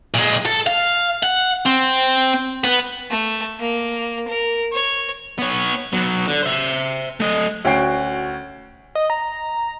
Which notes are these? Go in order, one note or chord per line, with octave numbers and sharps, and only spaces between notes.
A#2 G#3
A4
F5
F#5
C4
B3 B4
A3
A#3
A#4
C#5
B3 C#5
F#3 B3
D3
C5 E5
A3 D#5
D2 C#4 F#4 G5 C7 D7
D#5
A#5